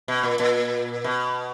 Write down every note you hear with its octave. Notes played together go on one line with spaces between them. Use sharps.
B2
A#2
A#2
B2